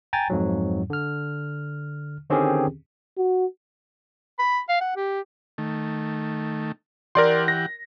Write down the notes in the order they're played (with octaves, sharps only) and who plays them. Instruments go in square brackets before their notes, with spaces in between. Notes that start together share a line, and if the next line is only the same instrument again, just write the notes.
[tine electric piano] G5 G#5 A#5 A6
F2 G#2 F#3
D3 F6
D3 D#3 C4 C#4 G4 G#4
[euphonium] F#4
[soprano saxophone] B5
F5
F#5
G4
[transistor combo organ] D#3 A3
[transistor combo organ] E3 G4 F#5 [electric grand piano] A#4 D5 C6
[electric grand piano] A#6